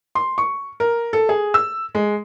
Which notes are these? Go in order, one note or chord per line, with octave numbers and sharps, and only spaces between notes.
C6
C#6
A#4
A4
G#4
E6
G#3